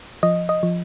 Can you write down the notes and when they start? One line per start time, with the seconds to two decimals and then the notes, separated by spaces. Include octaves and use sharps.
0.23 F3 D#5
0.49 D#5
0.63 F3